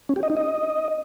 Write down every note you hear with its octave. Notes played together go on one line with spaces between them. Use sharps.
C#4
G4
D#5
D#4
D#5